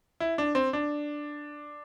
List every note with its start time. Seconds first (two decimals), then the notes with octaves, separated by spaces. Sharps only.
0.20 E4
0.38 D4
0.55 C4
0.73 D4